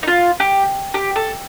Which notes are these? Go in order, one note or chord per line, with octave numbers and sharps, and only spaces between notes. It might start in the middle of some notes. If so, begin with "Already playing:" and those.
D#4
F4
G4
G4
A4